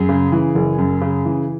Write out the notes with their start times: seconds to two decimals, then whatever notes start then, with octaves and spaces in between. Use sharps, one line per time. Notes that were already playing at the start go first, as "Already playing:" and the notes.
Already playing: F#2 G#4
0.09 C#3
0.32 E3
0.55 F#1
0.78 F#2
1.01 C#3
1.25 E3